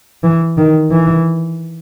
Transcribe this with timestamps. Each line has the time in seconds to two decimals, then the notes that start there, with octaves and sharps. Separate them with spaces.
0.23 E3
0.57 D#3
0.92 E3